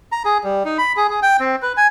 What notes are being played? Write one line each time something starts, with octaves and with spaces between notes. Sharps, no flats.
A#5
G#4
G3
D#4
B5
G#4
G#4
G5
C4
B4
G#5